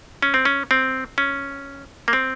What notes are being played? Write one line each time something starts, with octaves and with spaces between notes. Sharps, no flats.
C#4
C4
C#4
C4
C#4
A#3
C4